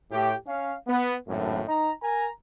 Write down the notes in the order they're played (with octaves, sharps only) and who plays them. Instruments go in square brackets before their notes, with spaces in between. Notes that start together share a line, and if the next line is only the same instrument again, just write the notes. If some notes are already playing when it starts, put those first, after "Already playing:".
[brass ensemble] A2 G4
C#4 F5
B3
G#1 F#2 A2
D#4 A#5
A#4 G#5 A#5